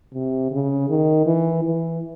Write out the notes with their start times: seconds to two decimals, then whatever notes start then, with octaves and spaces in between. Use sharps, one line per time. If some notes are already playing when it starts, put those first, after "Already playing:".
0.14 C3
0.52 C#3
0.89 D#3
1.26 E3
1.65 E3